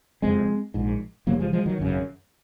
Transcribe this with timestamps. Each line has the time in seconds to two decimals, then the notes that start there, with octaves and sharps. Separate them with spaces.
0.22 F#1 F2 C3 G#3 C4
0.74 A#1 G#2
1.27 F1 F2 C3 F#3 A#3
1.39 F3 G#3
1.53 F3 G#3
1.66 D#3 F#3
1.79 G#1 F#2 C#3